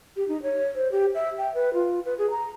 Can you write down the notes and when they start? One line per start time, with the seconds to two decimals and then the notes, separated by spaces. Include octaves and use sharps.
0.16 G4
0.28 D#4
0.42 C#5
0.75 C5
0.92 G4
1.15 E5
1.38 G5
1.55 B4
1.74 F4
2.05 B4
2.18 G#4
2.31 A#5